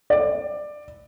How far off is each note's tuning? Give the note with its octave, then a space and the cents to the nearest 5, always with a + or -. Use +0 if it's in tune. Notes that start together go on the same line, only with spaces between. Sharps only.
D5 +15